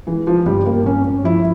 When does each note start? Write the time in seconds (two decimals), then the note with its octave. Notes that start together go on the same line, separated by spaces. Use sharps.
0.07 E3 G#3
0.27 F3
0.46 G2 G3
0.66 A#3
0.86 G2 C#4
1.24 F3 E4